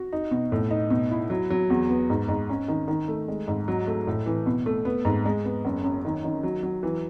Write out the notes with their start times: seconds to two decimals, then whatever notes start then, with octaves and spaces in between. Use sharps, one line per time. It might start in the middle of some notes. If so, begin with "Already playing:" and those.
Already playing: F#4
0.13 D#4
0.31 B2
0.52 A2
0.71 D#4
0.90 B2
1.11 E4
1.30 F#3
1.50 F#3
1.70 E2
1.89 B3
2.10 G#2
2.28 G#2
2.49 C#4
2.68 D#3
2.88 D#3
3.08 A3
3.28 G#3
3.48 G#2
3.68 F#3
3.87 A3
4.07 A2
4.26 E3
4.46 B2
4.66 A3
4.85 B3
5.05 G#2
5.25 G#3
5.45 B3
5.64 F#1
5.84 F#2
6.05 D#3
6.24 D#3
6.43 F#3
6.63 F#3
6.83 E3